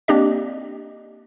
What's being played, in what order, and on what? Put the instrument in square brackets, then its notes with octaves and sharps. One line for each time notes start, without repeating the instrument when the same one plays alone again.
[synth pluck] A#3 C4 D4 G4 D5 D#5